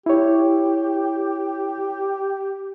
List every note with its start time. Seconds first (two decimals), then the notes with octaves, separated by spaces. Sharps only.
0.06 E4 G4 C#5